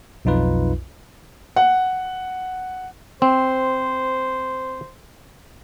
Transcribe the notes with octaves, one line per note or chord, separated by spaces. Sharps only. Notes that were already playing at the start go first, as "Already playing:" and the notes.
B1 F2 D#4 F4 B4
F#5
C4 C5